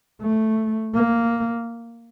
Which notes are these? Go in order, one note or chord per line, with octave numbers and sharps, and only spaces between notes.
A3
A#3